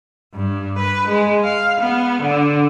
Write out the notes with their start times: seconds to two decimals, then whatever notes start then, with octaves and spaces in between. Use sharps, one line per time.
0.35 G2
0.79 B4
1.08 G#3
1.44 F5
1.81 B3
2.22 D3